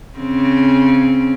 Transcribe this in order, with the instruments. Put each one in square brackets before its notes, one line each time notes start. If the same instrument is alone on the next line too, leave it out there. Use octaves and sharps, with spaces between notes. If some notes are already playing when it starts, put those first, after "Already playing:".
[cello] C#3 C4